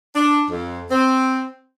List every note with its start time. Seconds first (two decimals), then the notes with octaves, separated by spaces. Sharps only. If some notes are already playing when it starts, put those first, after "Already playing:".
0.15 D4
0.50 F2
0.91 C4